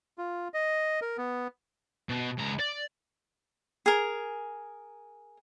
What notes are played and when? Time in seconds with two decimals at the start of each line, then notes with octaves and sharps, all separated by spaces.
0.18 F4
0.54 D#5
1.02 A#4
1.18 B3
2.10 B2
2.38 C#2 A#5
2.59 D5
3.86 G#4 A#4